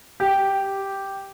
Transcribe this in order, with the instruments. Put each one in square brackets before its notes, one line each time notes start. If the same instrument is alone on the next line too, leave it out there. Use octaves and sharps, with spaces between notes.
[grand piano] G4